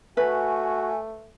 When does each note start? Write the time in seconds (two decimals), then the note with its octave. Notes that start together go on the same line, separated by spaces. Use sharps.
0.17 A3 F#4 B4 G#5